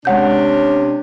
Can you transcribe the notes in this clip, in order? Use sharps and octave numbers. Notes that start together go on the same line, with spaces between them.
C3 G#3 C#4 D4 F#5 G6